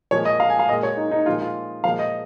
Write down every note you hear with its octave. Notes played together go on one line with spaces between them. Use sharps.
A#2 F3 G#3 C#5
D#5
F5
G#5
F5
A#2 G#3 D#5
C#5
D#4
D#4
A#2 F3 G#3 F4
F4
A#2 F3 G#3 F5
D#5